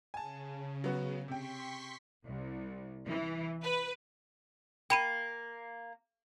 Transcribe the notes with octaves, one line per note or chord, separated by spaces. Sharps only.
C#3 G#5 A5
F#3 B3 F#4
C3 G5 C6 C#6 B6
C2
E3
B4
A#3 G5 B5 D#7